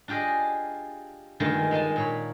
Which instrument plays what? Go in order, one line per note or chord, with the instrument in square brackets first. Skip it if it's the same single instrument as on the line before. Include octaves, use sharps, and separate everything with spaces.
[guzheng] D4 F4 G4 G#4 D#5
G2 D#3 G#3 A3 F4
G#3 D#4 G#5 A5
A#2 C#5 B5